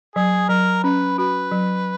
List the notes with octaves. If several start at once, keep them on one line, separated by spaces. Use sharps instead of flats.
F#3 G#4
F#3 A#4
C#4 B4
F#4 B4
F#3